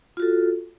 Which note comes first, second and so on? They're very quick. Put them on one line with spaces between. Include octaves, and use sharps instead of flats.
F4 F#4 A4